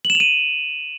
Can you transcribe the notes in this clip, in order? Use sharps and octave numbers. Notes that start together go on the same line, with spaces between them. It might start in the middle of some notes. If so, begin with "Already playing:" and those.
F#7
E7
F7
D#7